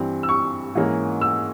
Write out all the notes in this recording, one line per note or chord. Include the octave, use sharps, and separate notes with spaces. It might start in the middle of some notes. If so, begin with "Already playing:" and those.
Already playing: G2 E3 G3 C4
E6
C#6
G#2 E3 A#3 C#4
E6